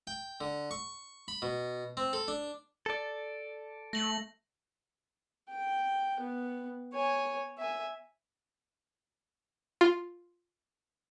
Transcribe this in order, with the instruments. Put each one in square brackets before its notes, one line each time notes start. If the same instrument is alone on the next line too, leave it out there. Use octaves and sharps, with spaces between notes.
[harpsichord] G5
D3
C#6
B5
B2
C4
A4
D4
[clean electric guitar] A4 D5
[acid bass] A3 [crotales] A#6 F#7
[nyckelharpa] G5
B3
C#5 G#5
E5 G#5
[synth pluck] F4